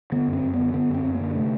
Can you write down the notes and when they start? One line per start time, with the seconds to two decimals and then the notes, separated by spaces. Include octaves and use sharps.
0.12 D3 B3
0.28 F#2
0.33 C4
0.43 F#2
0.53 B3
0.59 D3
0.74 D3 B3
0.89 F#2
0.94 C4
1.04 F#2
1.14 A#3
1.20 D3
1.35 C3 A3